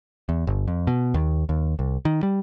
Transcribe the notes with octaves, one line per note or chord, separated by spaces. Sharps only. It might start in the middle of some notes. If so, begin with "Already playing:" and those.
E2
G1
F2
B2
D#2
D#2
C2
D#3
G3